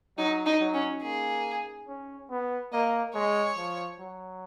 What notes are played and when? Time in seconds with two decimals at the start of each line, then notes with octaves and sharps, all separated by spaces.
0.18 F#3 D#4
0.46 D#4
0.60 F#3
0.74 C#4
1.02 A#3 G#4
1.88 C#4
2.31 B3
2.72 A#3 D#5
3.14 G#3 C#5
3.57 F3
4.00 F#3